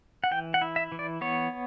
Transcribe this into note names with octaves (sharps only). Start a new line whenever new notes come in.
F#5
E3 G5
F#5
E4
E5
E3
D5
B3 C#5